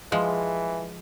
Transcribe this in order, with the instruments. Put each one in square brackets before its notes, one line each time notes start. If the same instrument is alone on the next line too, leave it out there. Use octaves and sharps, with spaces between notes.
[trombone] E3 [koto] F3 G#3